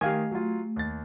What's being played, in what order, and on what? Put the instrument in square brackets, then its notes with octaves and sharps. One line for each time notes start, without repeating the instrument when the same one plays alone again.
[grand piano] D#3 [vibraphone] A3 [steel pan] G4 F5 G#5
[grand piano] F#3 F4 [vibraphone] A3
[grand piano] D#2 A6